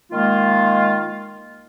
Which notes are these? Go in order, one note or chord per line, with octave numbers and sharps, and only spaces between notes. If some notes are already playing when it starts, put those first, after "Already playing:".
D#3 G#3 A#3 F4